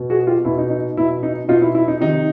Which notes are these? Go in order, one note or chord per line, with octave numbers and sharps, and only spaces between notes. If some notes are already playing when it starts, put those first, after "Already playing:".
Already playing: B2
F#4 G#4
F4 G4
B2 E4
D#4
D#4
B2 E4
D#4
B2 D#4 F4
E4
E4
D#4
C3 D#3 D#4